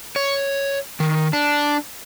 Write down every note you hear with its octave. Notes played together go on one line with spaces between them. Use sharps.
C#5
D#3
D4